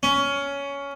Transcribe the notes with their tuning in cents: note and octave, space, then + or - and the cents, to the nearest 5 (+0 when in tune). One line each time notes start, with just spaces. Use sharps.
C#4 +15